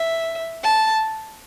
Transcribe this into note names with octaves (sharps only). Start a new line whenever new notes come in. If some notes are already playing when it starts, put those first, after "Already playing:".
Already playing: E5
A5